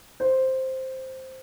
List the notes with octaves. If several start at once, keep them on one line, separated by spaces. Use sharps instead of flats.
C5